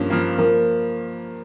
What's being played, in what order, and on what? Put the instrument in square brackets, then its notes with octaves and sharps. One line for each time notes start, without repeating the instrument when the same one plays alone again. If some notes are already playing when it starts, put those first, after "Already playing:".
Already playing: [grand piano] G2 F3 A#3 [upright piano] C#4
[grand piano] F3 A#3
[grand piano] F3 [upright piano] A#3